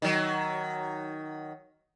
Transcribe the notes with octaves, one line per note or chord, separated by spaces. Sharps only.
D#3 F#3